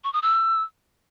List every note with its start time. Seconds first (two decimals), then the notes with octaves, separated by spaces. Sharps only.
0.04 C#6
0.13 D#6
0.22 E6